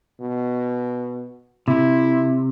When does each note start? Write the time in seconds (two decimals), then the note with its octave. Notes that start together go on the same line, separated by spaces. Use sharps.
0.20 B2
1.68 C3 E4